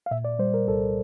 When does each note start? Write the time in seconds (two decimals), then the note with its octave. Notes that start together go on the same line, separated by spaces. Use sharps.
0.06 F5
0.11 A#2 E5
0.25 D5
0.39 G3 C5
0.54 A#4
0.68 C2 A4